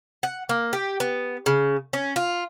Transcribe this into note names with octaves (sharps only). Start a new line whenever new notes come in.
F#5
A#3
G4
B3
C#3
C#4
F4